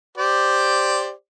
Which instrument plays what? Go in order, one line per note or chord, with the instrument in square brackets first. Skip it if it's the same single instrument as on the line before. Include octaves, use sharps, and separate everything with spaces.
[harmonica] G4 C5 D5